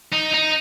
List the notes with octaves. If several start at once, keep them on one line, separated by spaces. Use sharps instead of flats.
D#4
D#4